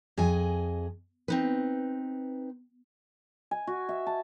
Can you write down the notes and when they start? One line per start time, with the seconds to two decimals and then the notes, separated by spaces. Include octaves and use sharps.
0.17 F2 G#4 D#5 G#5
1.28 C4 D#4 B4
3.51 G#5
3.67 F#4
3.89 E5
4.07 A5